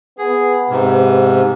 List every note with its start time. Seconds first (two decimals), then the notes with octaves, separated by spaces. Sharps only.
0.19 B3 G#4
0.70 G#2 C3